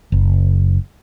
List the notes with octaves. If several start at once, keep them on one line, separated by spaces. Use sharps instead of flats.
F#1